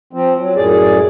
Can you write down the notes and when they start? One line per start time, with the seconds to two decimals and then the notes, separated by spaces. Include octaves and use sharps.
0.13 F3 C4
0.39 F#3
0.56 F#2 A2 G#4 D5